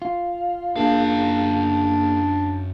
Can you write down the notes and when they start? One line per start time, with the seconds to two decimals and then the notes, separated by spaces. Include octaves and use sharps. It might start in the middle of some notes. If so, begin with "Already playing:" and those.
0.02 F4
0.76 F#2 A#3 D4 G#4 F5